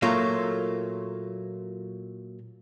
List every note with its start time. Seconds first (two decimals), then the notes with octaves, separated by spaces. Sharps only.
0.02 A#2 F#3 A3 A#3 F4